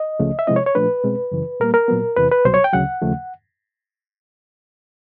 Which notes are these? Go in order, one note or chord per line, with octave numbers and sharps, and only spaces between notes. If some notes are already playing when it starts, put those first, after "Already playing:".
Already playing: D#5
C#2 C#3 F3 A3
E5
C3 F3 G#3 C4 E4 D#5
C#5
C#5
A#2 F3 A3 D4 B4
B2 G#3 C4
F#2 C#3 E3
A#2 G3 A#3 A#4
A#4
A#2 F#3 B3
E2 C3 E3 B4
B4
C2 B2 F#3 C5
C#5
G5
D2 C#3 F#3 F#5
D#2 C#3 F3 A3